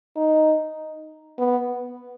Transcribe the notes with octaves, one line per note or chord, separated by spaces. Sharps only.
D#4
B3